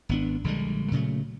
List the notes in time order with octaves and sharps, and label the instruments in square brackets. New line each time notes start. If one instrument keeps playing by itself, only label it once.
[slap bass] G#1 B3 D4
A#1 D3 G3 G#3
A#2 C#3 F#3 A3